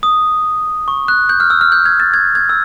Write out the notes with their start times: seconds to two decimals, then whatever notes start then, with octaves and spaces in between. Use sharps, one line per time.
0.03 D#6
0.88 C#6
1.08 F#6
1.29 G6
1.40 F6
1.50 E6
1.61 F6
1.72 G6
1.86 G#6
2.00 A6
2.14 G#6
2.35 G#6
2.49 E6